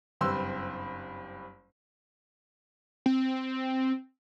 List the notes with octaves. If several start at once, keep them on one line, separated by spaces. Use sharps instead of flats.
F#1 G2 C4 B4 C6 E6
C4